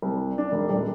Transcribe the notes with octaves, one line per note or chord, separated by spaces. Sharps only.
C2
D4
E1
D#1